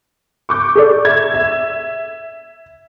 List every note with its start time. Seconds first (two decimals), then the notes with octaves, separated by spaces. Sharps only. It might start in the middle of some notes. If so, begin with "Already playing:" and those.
0.49 C#6 D6 G6
0.76 G#4 A4 D5
1.05 E5 G#6
1.34 E5